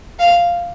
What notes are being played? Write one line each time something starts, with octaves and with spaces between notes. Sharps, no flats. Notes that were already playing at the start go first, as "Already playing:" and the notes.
F5